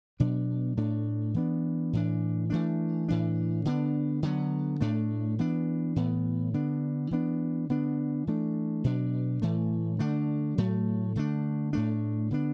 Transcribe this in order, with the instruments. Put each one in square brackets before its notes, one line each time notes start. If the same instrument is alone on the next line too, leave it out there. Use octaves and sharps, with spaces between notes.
[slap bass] B2 F#3 B3 D4
A2 A3 D4
E3 B3 D4
A2 E3 D4
E3 A3 D4
A2 E3 D4
D3 B3 D4
D3 F#3 B3
A2 A3 D4
E3 B3 D4
A2 E3 B3
D3 B3 D4
E3 B3 D4
D3 B3 D4
E3 A3 D4
B2 F#3 D4
A2 E3 A3
D3 A3 D4
A2 F#3 A3
D3 A3 D4
A2 A3 D4
D3 B3 D4